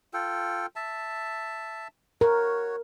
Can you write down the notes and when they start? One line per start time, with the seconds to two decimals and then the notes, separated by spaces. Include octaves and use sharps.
0.13 F4 A4 G5
0.76 E5 A5
2.21 F#4 A#4 C#5